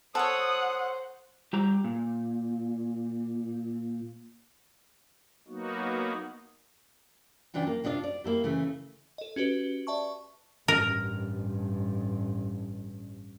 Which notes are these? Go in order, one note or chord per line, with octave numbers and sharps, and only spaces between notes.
A4 C5 C#5 F#5 D#6
G3 G4 A#5
A#2
F#3 A#3 B3 D#4 F#4
C#3 E3 D4 F4 G5
A#3
C3 D4 F4 D5 F5
D5
A#3 E4 G4
C#3 E3 A3
A4 D#5
C#4 F#4 G4 B4
D5 E5 A5 C#6
A1 G2 A#4